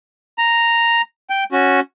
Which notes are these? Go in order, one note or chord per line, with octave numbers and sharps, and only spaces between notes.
A#5
G5
C#4 F#4